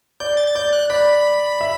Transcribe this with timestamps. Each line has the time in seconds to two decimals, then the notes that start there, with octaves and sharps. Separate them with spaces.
0.20 D5 G6
0.37 A6
0.47 A6
0.55 D5 G6
0.73 F#6
0.90 D5 B5
1.61 E5